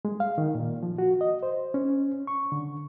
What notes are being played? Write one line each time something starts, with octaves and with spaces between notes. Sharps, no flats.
G#3
F5
D#3
A#2
F3
F#4
D#5
C5
C#4
C#6
D3